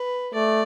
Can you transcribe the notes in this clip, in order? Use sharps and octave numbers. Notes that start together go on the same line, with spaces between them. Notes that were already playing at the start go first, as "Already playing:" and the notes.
Already playing: B4
A3 D5